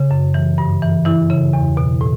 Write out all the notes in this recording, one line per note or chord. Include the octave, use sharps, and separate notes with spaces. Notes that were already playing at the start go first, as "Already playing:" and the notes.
Already playing: C#3
F#2
E3
G2
E3
E3 E4
C#3
E2
B2
A2